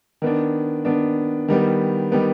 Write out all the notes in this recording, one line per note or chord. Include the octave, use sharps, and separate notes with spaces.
D#3 B3 D4
D#3 B3 D4
D#3 G3 B3
D#3 G3 B3